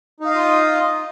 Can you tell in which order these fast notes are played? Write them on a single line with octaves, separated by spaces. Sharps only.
D#4 F5 D#5 F4